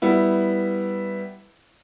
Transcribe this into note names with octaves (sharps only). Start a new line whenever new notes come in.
G3 B3 E4